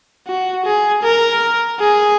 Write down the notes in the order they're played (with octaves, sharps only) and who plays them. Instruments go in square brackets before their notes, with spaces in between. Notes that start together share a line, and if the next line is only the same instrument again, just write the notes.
[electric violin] F#4
G#4
A#4
G#4